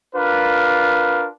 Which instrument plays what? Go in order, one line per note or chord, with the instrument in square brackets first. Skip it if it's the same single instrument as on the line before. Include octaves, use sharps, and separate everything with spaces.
[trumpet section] D4 F4 A#4 B4